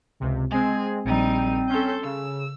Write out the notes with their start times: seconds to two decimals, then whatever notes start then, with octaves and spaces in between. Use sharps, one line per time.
0.20 C#2 C3
0.51 G#3 C4 G#4
1.05 A#1 G3 C4 D#4 D#7
1.69 C#4 A4 C6 G6
2.04 C#3 E6